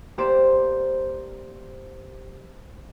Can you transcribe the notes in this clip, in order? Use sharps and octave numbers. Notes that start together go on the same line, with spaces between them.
A#3 G4 C5 D5 C7 E7